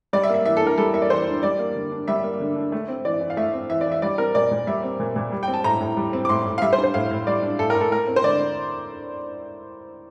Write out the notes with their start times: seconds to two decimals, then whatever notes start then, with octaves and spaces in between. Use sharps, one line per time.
0.13 G3 D5
0.23 E5
0.29 A#3
0.34 E5
0.45 E3 E5
0.57 A4
0.61 D4
0.67 A#4
0.78 G3 A4
0.94 A#3 E5
1.02 D5
1.10 E3 C5
1.26 D4
1.43 G3 D5
1.59 A#3
1.75 D3
1.92 D4
2.08 G3 E5
2.24 A#3
2.40 D3
2.56 D4
2.72 A3
2.89 C4
3.05 E3 D5
3.21 E3
3.30 F5
3.37 A3 E5
3.54 C4
3.69 E3 E5
3.81 D5
3.86 E3
3.92 E5
4.02 G3 D5
4.18 C4 A#4
4.35 A#2 D5
4.51 A#2
4.67 G3 E5
4.83 C4
5.00 A#2
5.16 A#2
5.32 G3
5.43 G5
5.48 C4
5.54 A5
5.64 A2 A#5
5.80 A2
5.97 G3
6.13 C4
6.25 D6
6.29 A2 C6
6.45 A2
6.58 F5
6.62 G3 E5
6.73 C5
6.78 D4
6.84 C5
6.94 A2 F5
7.11 A2
7.27 G3 D5
7.43 D4
7.59 A2 A4
7.70 A#4
7.75 A2
7.81 A4
7.92 A3 A#4
8.07 C4
8.16 C5
8.24 D3 D5